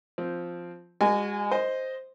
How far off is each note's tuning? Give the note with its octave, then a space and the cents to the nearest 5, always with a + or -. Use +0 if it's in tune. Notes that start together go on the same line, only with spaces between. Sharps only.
F3 +0 C4 +0
G#3 -30 F#4 +0 G#5 +0
C5 +0 D#5 +0